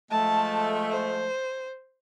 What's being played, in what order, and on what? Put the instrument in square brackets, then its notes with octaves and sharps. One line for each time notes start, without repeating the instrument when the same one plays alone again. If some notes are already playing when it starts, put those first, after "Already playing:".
[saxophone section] F3 G#3 A3 [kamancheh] A5
[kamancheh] C5